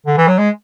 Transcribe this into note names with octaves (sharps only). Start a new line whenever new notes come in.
D3
E3
F#3
G#3